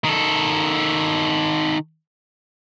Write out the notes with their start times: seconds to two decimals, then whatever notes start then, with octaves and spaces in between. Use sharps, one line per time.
0.04 D#3 A4